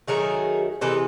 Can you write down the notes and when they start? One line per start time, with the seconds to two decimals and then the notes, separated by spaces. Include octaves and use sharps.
0.08 D#3 F#3 A3 G#4 A#4
0.81 C3 E3 G#3 A4 B4